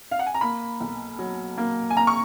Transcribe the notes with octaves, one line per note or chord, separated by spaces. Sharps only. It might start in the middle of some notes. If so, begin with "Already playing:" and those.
F5
F#5
G#5
A#5
A#3 B5
B1
F#3
A#3
G#5
A#3 A#5
C#6